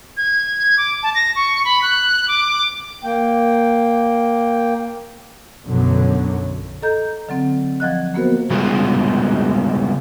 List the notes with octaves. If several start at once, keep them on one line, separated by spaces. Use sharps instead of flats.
G#6
D6
A5
A#6
C#6
B5
F#6
D6
A#3 G5
B1 F#2 B2 D3 F#3
A4 D#5 A#5 G6
D3 F#3 C4
F3 F#3 D#5 F#6
A#3 B3 F#4 A#4 C5
C#3 G3 G#3 B3 F4 F#4